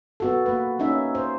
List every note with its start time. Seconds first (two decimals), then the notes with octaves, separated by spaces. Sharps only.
0.20 B3 F#4 A4
0.46 A#3 B4
0.79 A#3 C#4 D#4 E5
1.15 C5